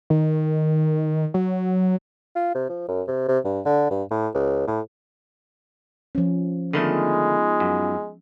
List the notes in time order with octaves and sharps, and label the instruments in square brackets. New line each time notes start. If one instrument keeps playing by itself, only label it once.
[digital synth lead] D#3
F#3
[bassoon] F4
C3
F3
F#2
C3
C3
G2
D3
G2
A2
C#2
A2
[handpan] F3 C#4
[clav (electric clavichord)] D3 D#3 A3 [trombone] G#3 [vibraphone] B3 D#4 F4
[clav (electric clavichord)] F#2